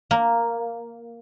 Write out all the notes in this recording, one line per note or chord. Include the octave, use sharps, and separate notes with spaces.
A#3